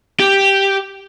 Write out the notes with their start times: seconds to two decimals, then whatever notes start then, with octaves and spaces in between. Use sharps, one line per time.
0.20 G4